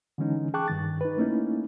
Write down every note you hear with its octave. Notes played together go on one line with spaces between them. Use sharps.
D3 E3 G#3 C#4 D#4
G#4 G5 A5 C#6 D6 F#6
G2 D#3 A6
D#4 B4
A3 A#3 C#4 D#4 E4